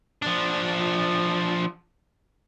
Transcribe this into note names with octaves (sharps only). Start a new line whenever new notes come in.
F3 D4